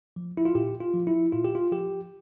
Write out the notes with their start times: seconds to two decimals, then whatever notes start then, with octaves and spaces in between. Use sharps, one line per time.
0.16 F3
0.37 E4
0.45 F4
0.55 A#2 G4
0.80 F4
0.93 F3
1.07 E4
1.32 A#2 F4
1.44 G4
1.55 F4
1.72 F3 G4